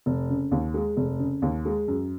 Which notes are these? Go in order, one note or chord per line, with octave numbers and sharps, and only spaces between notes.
F1
C#3
D#2
G#3
F1
C#3
D#2
G#3
F#2